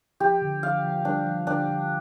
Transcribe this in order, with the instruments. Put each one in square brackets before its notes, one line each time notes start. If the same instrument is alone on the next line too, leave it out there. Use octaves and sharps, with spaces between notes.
[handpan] F3 [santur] G4
[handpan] D3
[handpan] F3 [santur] F5
[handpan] F3
[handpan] G3 [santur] D4
[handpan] F3
[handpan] D3 [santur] D4
[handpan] F3